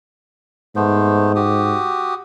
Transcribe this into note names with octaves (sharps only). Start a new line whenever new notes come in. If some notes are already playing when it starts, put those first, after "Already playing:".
G#2 A3 B3 C5
F#4 G4 D#6